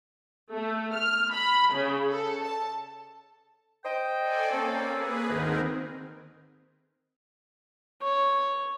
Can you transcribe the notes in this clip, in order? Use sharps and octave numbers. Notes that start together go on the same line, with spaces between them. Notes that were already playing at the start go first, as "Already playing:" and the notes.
A3
F6
B5
C#3
A4
A5
C5 D#5 G5
A4 D5 G#5
A#3 C4 C#4 A4
G#4 B4
D2 G#2 D#3 C4 D#4 A#4
C#5